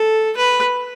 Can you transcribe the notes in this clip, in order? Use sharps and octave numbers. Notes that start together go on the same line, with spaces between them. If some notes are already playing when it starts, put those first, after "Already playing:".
Already playing: A4
B4